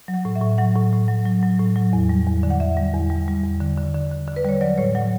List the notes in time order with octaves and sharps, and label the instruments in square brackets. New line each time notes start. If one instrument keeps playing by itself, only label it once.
[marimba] F#3
F#5
A2
E5
A2
F#3 F#5
A2
A2
F#3
F#3
F#3
A2
F#3
E2
G3
E2
D3
F#5
E2 E5
G3
E2
G3
G3
E2
D3
D3
D3
D3
D3
B4
G3 C#5
F#3 D5
A2 C#5
F#3 F#5